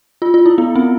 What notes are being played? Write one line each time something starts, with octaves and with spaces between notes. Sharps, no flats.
F4
F4
E4
B3
C4